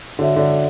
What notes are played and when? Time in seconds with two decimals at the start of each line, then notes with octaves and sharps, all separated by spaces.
0.19 D3 F#4 C#5 E5
0.36 D3